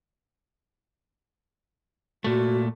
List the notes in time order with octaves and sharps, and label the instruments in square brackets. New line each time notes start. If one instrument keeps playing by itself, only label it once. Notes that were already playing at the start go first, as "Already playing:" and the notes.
[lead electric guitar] A#2 A3 [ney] F#4